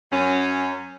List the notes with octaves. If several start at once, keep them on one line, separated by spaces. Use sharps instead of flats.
F#2 C#4